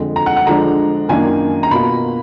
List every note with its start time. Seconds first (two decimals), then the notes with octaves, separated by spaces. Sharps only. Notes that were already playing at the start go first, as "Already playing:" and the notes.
Already playing: F2 D3 F3 G#3
0.16 A#5
0.26 F#5
0.36 F#5
0.47 D3 F3 G#3 D4 A#5
1.08 F#2 D#3 A#3 D4 F4 G#5
1.63 A#5
1.71 B2 A#3 F4 B5